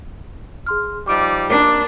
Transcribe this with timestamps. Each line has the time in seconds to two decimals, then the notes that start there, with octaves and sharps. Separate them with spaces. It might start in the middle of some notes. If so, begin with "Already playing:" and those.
0.66 G#4 C6 F6
1.08 F3 G3 D#4 D6 D7
1.49 A#3 D4